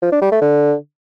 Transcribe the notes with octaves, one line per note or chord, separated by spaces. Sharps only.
F3
D4
G3
A3
D3